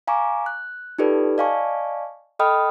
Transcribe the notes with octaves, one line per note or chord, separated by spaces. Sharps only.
F5 G#5 A#5 C#6 D6
F#6
D#4 F4 G4 A4 B4 D5
D5 D#5 F5 G#5 A5 C#6
A4 D#5 G5 B5 D#6 F6